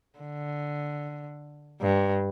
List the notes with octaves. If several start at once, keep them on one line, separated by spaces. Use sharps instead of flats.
D3
G2